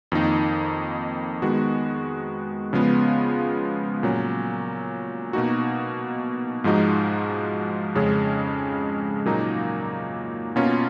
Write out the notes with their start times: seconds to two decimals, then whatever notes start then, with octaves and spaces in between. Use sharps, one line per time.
0.12 F2 D#3 A#3 D#4
1.42 D#3 G#3 B3 F#4
2.73 C#3 F3 G#3 B3 F4
4.03 A#2 F#3 C#4
5.33 B2 A#3 D#4 F#4
6.64 G#2 F3 G#3 D#4 F#4
7.95 F2 C#3 G#3 C#4
9.25 A#2 F#3 A#3 D#4
10.56 B2 A#3 C#4 F4